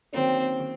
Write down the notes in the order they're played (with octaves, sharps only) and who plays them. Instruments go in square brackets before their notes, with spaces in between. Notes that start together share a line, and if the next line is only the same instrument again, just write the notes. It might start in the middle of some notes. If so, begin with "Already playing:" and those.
[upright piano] D#3 F#3 A#3 C#4 [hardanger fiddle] C4
[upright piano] D#3